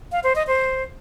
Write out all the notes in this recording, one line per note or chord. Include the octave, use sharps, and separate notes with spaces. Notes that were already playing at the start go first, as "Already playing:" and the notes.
F5
C5
D#5
C5